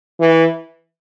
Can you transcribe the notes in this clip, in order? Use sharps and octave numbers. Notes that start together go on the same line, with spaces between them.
E3